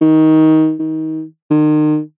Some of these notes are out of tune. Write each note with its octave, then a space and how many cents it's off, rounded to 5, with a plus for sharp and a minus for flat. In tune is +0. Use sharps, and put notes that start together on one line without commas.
D#3 +15
D#3 +25
D#3 -35